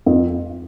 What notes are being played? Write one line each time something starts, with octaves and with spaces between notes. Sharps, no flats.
F2